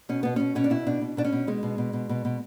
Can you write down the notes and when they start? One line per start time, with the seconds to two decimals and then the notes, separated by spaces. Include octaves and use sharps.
0.09 B2 C#4
0.23 B2 B3
0.36 B2 C#4
0.55 B2 C#4
0.64 D4
0.70 B2 E4
0.86 B2 D4
1.01 B2
1.17 B2 D4
1.24 C#4
1.32 B2
1.47 B2 G#3
1.63 B2
1.78 B2
1.93 B2
2.09 B2
2.25 B2